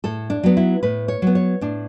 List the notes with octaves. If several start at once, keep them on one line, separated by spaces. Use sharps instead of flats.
A2 A4
D4
F#3 B3
E4
A2 B4
C#5
F#3 B3
C#5
A2 D4